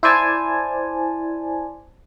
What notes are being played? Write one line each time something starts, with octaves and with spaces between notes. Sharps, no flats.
E4 C5 D5 G#5 A5